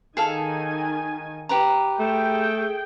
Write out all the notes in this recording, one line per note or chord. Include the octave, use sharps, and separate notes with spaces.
D#3 G#4 A4 F5 G#5
G4 B4 A#5
A3 G#4 G5